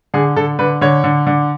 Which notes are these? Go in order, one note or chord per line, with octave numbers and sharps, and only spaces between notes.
D3 G#4
D3 A4
D3 B4
D3 C#5
D3
D3